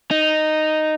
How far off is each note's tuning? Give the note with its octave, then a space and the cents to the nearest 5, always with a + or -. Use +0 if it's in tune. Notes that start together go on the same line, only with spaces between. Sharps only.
D#4 -5